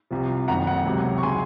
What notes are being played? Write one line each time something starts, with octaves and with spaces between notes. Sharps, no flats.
C2 C3 F3
F#1 F2 D#3 F#3 F#5 A#5
F#5 A#5
C#2 C3 F#3
C#6
C#3 F#3 G#5 C6